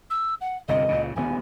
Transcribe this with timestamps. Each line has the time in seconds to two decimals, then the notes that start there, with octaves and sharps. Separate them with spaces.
0.10 E6
0.41 F#5
0.68 G1 C2 C3 D#5
0.88 C#2 A#2 C#3
1.16 D#1 D2 B3 G#5